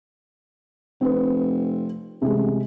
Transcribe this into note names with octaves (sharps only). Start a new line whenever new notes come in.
F1 C4 B4
A1 C3 G#3